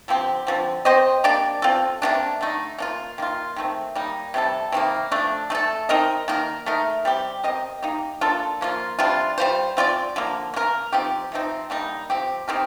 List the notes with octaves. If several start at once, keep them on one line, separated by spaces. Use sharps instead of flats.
D3 F3 C4 G4
D3 F3 C4
C4 G4 C5 D#5
A#3 D4 G4 D5
C4 F4 A4
C3 D#3 A#3 D4
D3 A3 D#4
A#3 D4 F4
D#3 A#3 F4
D#3 A3 C4
G3 A#3 D#4
C3 G3 D4 A4
C3 D#3 G3 A#3
F3 A3 D4
A3 D#4 A4
C4 D#4 A#4 D#5
D#3 A#3 F4 A#4
A3 D#4 A#4
G3 C4 G4
C4 G4 A#4 D#5
A#3 D#4 G4
A#3 D4 F4 A4
F3 A#3 F4
C3 G3 D4 F4
G3 A#3 F4 C5
C4 F4 A#4 D5
D3 F3 A#3
A#3 F4 A#4
F3 C4 D#4 G4
C3 F3 C4 D#4
D3 G3 A#3 D#4
F3 C4 G4
C4 D#4 G4 A#4